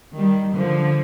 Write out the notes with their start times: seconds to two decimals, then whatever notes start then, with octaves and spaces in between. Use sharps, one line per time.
0.16 D#3 G3
0.55 D3 F3